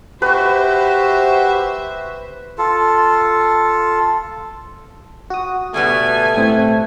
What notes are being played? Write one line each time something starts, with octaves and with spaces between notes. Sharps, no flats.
F#4 G4 B4 C5 E5 C#6
F4 A4
F#4 D#6
B2 G3 A3 B3 G#5
A2 C4